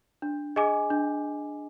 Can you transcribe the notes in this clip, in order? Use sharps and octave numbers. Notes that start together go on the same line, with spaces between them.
D4
G#4 D#5 G#5 D6
D4